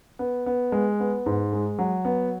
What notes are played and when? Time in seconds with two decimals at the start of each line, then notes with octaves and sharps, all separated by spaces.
0.19 B3
0.46 B3
0.72 G#3
1.00 B3
1.26 G#2
1.53 G#3
1.79 F#3
2.05 B3